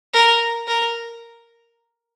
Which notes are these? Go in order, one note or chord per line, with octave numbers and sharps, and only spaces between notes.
A#4
A#4